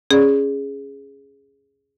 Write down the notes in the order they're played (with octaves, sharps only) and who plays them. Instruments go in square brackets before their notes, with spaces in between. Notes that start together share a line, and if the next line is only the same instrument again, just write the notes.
[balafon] C#4 D5 [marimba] G#4